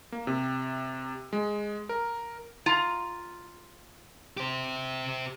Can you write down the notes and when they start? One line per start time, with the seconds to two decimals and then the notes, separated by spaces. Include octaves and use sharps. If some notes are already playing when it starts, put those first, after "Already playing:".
0.12 A#3
0.27 C3
1.33 G#3
1.89 A#4
2.66 F4 A#5
4.37 G4 C5